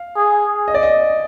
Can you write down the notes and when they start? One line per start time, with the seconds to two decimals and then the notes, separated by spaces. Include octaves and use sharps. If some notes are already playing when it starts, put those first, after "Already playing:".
Already playing: F5
0.16 G#4
0.68 D#5
0.74 D5
0.83 D#5